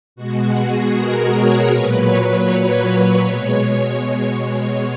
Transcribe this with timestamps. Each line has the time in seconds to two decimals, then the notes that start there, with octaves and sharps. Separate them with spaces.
0.16 B2 G#3 F#4
0.54 G#4
0.92 A#4
1.31 C#5
1.69 A#2 F#3 B4
2.08 C#5
3.23 B2 G#3
4.00 C#5